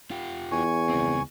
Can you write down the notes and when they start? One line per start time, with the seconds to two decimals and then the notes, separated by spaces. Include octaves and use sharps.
0.11 F4 G4
0.52 E2 G#5 C#6
0.89 C#2 C4